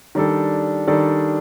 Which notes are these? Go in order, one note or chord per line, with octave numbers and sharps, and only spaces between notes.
D#3 G3 D4 A4
D#3 G3 D4 A4